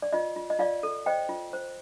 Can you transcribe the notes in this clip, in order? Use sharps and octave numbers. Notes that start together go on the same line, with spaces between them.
D5
F4 D#5
F4
D#5
F4 D5 F5
A4
C5 D#5 G5
F4
C5